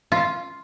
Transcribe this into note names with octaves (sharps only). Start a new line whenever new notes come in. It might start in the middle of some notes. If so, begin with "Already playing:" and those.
F4